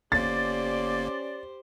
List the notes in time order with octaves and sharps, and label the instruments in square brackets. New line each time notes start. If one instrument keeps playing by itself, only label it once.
[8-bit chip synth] G1 A#3 [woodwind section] C#4 D5 [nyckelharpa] G4 C5 [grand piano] A6